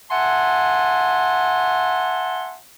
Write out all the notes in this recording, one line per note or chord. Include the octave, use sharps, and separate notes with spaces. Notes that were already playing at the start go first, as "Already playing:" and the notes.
E5 F#5 G#5 A5 C6